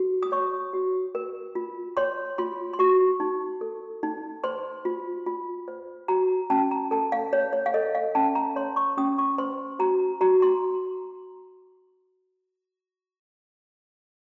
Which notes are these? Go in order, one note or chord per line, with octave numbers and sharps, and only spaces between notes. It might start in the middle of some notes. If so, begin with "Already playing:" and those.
Already playing: F#4
D#6
C#5 C#6
F#4
A#4
F4
C#5 C6
F4 C6
C6
F#4 C#6
D#4
A4
D#4
C5 C6
F4
F4
C5
F#4 A#5
C#4 A5
A#5
A4 A5
F5
C#5
C#5
F5
A4 D#5
F5
C#4 A5
A#5
C#5 C6
C#6
C#4 D#6
C#6
C5 C6
F#4 A#5
F#4 A#5
C6